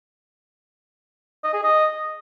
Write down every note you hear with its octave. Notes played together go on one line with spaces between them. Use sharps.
D#5
G#4
D#5